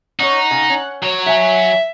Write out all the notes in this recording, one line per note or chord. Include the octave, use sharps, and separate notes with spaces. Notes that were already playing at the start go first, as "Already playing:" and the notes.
C#4 D#4 C#5 F#5
C#3
C#4
F#3 C#5
E5 F#5 G#5